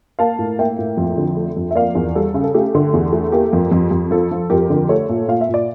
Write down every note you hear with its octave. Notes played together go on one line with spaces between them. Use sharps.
A#3 F5 A5
A2
A#3 E5 G5
A2
F2
D3
A3
F2
E5
A#3 D5 F5
E2
G3 A4
C#3
A4
A3 G4
D3
E2
A3
A#3 G4
F2
F2
F2
F3 A4
F3
F2 G4 A#4
D3
A3 A4 C#5
A#2
A#2 F5
E5
A#2
D5